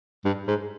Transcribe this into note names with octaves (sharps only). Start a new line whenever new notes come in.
G2
G#2